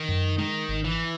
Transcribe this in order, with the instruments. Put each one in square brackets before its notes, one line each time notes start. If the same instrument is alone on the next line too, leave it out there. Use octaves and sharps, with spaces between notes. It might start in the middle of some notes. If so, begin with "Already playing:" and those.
Already playing: [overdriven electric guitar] D#3
[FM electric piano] F#2
[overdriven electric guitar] D#3 [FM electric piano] G#3
[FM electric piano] G#1
[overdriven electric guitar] E3